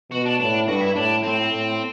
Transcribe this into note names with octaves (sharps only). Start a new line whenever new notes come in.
B2 F#4
D4
A2 D4
G2 F#4
E4
A2 D4
A2 C4
A2